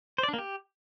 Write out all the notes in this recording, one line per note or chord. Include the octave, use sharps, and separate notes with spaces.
C5
D5
D4
A#3
G4